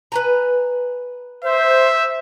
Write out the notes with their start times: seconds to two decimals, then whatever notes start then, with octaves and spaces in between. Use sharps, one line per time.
0.12 B4 G#5 A#5
1.44 C5 E5